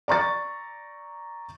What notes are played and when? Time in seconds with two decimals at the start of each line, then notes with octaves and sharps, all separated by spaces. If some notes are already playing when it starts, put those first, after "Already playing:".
0.08 D5 A#5 C#6 A6